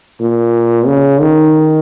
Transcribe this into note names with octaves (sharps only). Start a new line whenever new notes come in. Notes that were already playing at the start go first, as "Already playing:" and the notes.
A#2
C#3
D#3